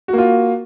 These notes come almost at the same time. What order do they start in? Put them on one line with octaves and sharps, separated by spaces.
F#4 A#3 F4